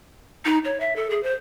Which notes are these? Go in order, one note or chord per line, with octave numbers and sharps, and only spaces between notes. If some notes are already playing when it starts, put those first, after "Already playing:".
D#4
C#5
E5
A4
G#4
C5